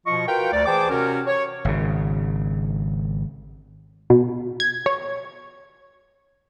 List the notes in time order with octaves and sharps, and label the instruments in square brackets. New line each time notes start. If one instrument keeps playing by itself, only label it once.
[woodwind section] B2 F3 F4 D#5 C#6
F4 F#4 A#4 B4 F5 G5
D2 D5
E3 G#4 C5 G5 A5 D6
C3 C#4 F#4 A#4
C#5
[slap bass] G#1 C#3
[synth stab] B2
G#6
C#5